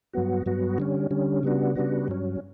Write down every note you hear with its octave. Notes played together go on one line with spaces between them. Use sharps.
G2 F#3 B3 F#4
G2 F#3 B3 F#4
D3 G3 C#4
D3 G3 C#4
C#3 G3 B3 D4 F#4
C#3 G3 B3 D4 F#4
G2 F#3 C#4